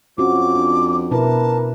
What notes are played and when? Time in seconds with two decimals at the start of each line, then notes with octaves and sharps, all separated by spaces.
0.18 F2 F3 C#4 F#4 D6
0.56 D4
1.11 B2 E4 A#4 B4 A5